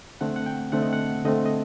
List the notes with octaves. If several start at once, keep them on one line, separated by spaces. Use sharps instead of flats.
D3 A3 C4 F#5
F#5
G5
D3 A3 C4 F#5
D#5
F#5
D3 A3 C4 D#5
D#5